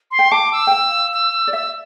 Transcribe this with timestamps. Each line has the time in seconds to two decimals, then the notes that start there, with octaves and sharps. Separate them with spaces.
0.11 C6
0.19 G5
0.32 A5 D6
0.52 E6
0.67 G5
0.71 F5
1.13 E6
1.47 D5
1.53 E5 E6